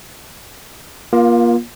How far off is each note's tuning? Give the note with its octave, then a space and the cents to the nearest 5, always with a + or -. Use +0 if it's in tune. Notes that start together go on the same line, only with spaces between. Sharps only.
A#3 +30 F4 +0